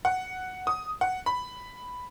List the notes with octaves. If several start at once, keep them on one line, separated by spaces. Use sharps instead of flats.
F#5
D#6
F#5
B5